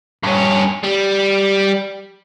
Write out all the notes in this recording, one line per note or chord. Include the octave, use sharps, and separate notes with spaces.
G2 C#4
G3